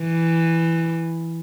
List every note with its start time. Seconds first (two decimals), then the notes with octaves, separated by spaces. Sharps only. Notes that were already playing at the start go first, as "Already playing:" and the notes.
Already playing: E3